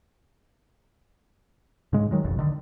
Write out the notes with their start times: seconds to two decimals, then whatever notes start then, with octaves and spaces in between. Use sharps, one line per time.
1.93 G#2 C#3 G#3
2.11 D#3 F#3 G#3
2.24 F#1 B1 F2
2.39 D3 D#3